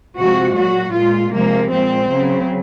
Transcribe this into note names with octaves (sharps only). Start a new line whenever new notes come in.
C3 F3 G#3 F#4
A#2 F#3 F#4
A#2 G#3 F4
C3 F3 G#3 A#3
A#2 G#3 C4
C#3 F#3